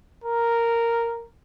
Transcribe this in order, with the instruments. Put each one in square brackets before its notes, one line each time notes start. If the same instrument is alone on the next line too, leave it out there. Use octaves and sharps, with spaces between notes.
[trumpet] A#4